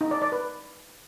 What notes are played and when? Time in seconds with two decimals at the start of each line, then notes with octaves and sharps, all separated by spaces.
0.01 D#4
0.11 D5
0.22 D5
0.32 B4